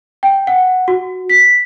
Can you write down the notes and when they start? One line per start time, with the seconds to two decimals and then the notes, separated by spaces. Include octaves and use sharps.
0.23 G5
0.47 F#5
0.88 F#4
1.30 B6